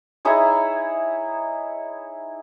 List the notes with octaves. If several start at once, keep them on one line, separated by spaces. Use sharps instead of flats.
D#4 E4 G#4 C#5